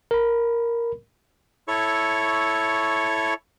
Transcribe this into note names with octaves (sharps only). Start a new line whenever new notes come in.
A#4 B5
E4 A4 C#5 C#6